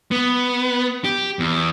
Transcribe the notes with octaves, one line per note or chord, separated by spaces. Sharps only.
B3
G4
E2